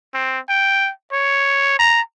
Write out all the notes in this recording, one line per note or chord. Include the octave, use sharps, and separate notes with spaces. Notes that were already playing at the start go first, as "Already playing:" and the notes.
C4
G5
C#5
A#5